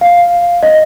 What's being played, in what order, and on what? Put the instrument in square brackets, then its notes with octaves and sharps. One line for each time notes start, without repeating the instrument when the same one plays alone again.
[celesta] F5
D#5